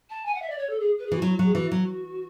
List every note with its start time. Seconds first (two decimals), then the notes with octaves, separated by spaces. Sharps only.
0.09 A5
0.25 G#5
0.34 F#5
0.41 E5
0.49 D5
0.58 C#5
0.69 A4
0.79 G#4
0.98 B4
1.06 G#4
1.12 E3 F#4
1.22 F#3 E4
1.34 F#4
1.39 F#3
1.44 G#4
1.55 E3 F#4
1.72 F#3